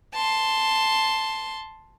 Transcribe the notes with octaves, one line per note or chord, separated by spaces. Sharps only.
A5 C6